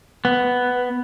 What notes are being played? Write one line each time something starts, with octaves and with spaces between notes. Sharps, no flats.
B3